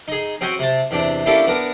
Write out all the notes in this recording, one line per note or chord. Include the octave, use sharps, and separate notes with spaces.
D#4 G#4
C4 C#4 F#4 G5 G#5
C3 A5
E2 C3 D4
A#3 C#4 D4 E4 G4 A4
B3 D4 A#4